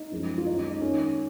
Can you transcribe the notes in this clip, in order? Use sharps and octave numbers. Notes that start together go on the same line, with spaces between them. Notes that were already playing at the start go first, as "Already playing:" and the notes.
Already playing: D#4
F#2 F3 G#3
F4
F#2 D#3 G#3 D#4
D#4
D#4
D#2 D#3 G#3 C#4